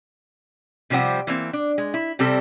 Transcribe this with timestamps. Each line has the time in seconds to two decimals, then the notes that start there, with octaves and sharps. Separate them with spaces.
0.90 C3 F3 G3 C4 F#5
1.27 E3 A#3 C4
1.53 D4
1.78 G#3
1.94 E4
2.19 C3 G3 C4 A4